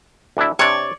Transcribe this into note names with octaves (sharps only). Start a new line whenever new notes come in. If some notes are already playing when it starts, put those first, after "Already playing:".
D2 D4 E4
C3 D4 C#5 D5